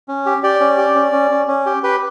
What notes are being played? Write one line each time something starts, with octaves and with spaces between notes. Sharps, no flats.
C#4
G4
G4 D5
C#4
G4
C#4
C#4
C#4
C#4
G4
G4 B4